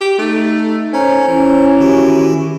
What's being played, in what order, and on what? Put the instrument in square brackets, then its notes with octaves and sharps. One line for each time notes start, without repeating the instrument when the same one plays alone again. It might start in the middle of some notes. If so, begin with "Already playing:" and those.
[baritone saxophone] G4
[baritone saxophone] A3 [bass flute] D#4
[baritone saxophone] C#4 [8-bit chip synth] C5 A#5
[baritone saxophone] E3 [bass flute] C#4
[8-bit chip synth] D#3 F#4 G4